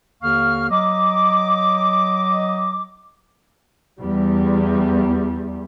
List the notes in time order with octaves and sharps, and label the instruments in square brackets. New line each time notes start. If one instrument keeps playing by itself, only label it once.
[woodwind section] D#2 D3 A#3 F5 C#6 F6
F#3 D#5 D6
[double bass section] E2 G3